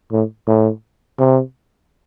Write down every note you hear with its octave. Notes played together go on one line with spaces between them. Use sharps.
A2
A2
C3